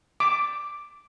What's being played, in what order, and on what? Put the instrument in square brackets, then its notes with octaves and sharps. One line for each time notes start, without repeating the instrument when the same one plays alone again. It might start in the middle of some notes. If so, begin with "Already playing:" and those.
[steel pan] D6